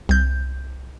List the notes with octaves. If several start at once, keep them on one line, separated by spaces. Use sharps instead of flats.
C2 G6